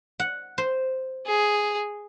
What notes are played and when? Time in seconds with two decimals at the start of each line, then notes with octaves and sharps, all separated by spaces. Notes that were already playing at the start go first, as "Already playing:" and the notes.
0.20 F#5
0.58 C5
1.26 G#4